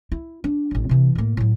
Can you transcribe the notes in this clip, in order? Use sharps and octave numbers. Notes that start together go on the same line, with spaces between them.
E4
D4
A1 F#3
C3 E3
A2 A#3
A2 F#3